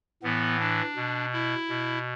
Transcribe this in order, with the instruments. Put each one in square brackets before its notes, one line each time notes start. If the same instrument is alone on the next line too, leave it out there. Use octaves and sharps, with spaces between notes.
[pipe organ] A2 E3 B3
D4
B2
E4
B2